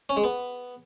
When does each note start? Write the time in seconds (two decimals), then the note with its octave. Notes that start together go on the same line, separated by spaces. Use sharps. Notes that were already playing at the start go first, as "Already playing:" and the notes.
0.09 C#4
0.17 G#3
0.24 B3